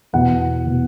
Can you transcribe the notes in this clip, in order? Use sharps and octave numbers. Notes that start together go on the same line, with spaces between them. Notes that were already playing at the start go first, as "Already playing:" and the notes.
E2 B2 F#5
B2